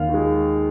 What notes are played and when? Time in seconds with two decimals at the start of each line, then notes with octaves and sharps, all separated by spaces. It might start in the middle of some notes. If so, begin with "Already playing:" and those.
Already playing: D#2 F5
0.09 D#3 G#3